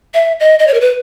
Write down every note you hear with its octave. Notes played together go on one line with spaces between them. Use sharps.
E5
D#5
D#5
C#5
A#4
B4